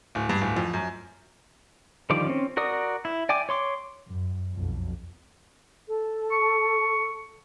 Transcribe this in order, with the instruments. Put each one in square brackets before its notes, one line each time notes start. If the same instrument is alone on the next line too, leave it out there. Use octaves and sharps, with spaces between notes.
[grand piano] D1
G2
D1
F2
F#2
[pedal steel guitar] D3 D#3 F3 G3 D6
C4 C#4
F#4 A#4 D5 D#6
E4
D5 G5 G#5 D6
C#5 C6 D6
[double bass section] F#2
B1 F2
[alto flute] A4
[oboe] C#6